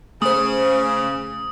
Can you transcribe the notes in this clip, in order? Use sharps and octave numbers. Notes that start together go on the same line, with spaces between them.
C#3 A3 C5 D#6